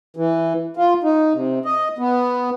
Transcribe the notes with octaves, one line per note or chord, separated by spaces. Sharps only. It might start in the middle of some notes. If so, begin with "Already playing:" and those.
E3
F4
D#4
C3
D#5
B3